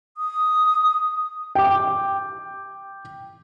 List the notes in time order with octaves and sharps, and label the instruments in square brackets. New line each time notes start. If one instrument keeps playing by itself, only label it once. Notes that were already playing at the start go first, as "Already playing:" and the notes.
[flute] D#6
[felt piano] G5 D6